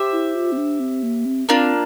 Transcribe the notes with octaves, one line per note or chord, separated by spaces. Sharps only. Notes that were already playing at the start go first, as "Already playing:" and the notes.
Already playing: G4 C5 E5
E4
F4
C4
D4
C4
A#3
C4
A#3 C4 D4 F4